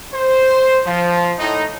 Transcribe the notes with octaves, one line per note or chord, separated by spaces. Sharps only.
C5
F3
A2 D#4